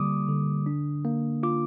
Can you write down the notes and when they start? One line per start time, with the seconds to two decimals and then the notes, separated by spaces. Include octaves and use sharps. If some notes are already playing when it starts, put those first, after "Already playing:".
Already playing: D3 G3 A#3 D6 D#6
0.28 D3
0.66 D4
1.05 A#3
1.43 F4 D6